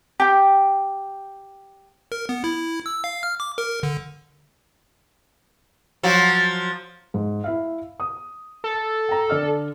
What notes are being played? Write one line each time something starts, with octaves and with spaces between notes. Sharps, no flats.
G4 G5
A#4
B3
E4
E6
F5
F6
D6
A#4
D3
F3 F#3 F#4
G#2
E4 E5 F5
D#6
A4
G5 A#5
D3 D5 F6